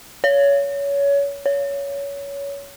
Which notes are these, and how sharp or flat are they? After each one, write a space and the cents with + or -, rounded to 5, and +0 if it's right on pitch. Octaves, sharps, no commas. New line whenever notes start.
C#5 +25
C#5 +20